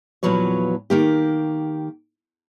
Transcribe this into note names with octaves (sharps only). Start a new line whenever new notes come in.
E2 A#2 F3 F#3 B4 C#5
D#3 A#3 G4